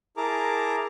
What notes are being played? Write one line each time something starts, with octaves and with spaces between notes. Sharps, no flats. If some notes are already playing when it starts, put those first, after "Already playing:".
E4 G#4 A#4 A5 A#5 D6